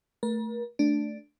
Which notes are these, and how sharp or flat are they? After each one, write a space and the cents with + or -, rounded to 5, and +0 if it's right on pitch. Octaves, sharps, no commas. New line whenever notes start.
A3 +10 A#4 +40
A3 -5 D4 +0